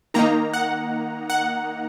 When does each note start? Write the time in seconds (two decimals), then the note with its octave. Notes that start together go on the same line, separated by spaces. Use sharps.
0.14 D#3 A#3 D#4 A#5
0.54 F#5
1.30 F#5